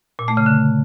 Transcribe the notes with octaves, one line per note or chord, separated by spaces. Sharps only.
A#2
A3
C#3
D3